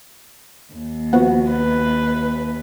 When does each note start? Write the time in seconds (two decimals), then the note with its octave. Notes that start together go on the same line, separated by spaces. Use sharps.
0.70 D#2
1.13 F3 B3 F#4
1.50 B4